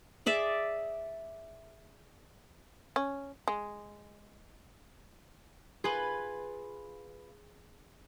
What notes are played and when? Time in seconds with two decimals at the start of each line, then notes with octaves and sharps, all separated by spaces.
0.26 G#4 D5 E5
2.96 C#4
3.48 G#3
5.84 F4 G#4 B4